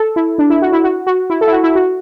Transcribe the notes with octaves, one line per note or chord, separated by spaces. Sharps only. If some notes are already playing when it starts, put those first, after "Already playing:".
Already playing: A4
E4
D4
E4
F#4
E4
F#4
F#4
E4
A4
E4
F#4
E4
F#4